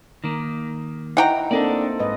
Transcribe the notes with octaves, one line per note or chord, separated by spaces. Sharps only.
D#3 A#3
D#4 E4 F#5 G5 A#5
A#3 C4 D4 D#4 A4 D5
G#2 B4 D#5